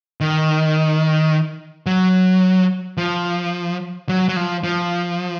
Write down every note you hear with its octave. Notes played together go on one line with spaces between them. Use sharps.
D#3
F#3
F3
F#3
F#3
F3
F3